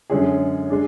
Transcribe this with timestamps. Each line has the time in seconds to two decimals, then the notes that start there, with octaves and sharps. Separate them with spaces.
0.10 F#2 D3 G#3 C#4 G#4
0.70 G#3 D4